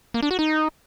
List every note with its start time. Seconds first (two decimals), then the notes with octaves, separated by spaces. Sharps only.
0.14 A#3
0.23 D4
0.31 F#4
0.39 D#4